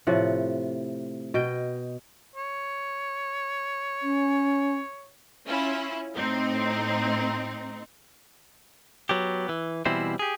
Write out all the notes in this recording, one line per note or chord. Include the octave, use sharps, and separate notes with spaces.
A2 C3 F3 F#5
B2 D#5 G5
C#5
C#4
C#4 E4 F4
A2 C4 D#4
F#3 B3 G4
E3
B2 E3 G3 C4 E4 C5
G4 G#4